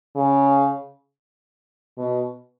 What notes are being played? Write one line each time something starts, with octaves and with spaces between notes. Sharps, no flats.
C#3
B2